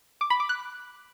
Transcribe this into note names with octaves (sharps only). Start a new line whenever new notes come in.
D6
B5
D6
F#6